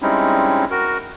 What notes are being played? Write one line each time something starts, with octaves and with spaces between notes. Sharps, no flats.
G3 G#3 C4 C#4 D#4 E4
F#4 A#4